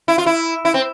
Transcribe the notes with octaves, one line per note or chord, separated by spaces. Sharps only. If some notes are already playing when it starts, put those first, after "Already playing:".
E4
F4
E4
E4
C4